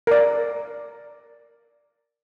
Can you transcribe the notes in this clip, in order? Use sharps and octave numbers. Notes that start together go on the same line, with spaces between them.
A#4 D5